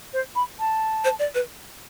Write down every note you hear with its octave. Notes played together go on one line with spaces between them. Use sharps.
C5
B5
A5
C5
D5
B4